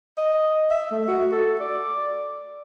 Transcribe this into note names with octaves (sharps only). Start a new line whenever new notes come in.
D#5
E5
A3
F#4
A4
D5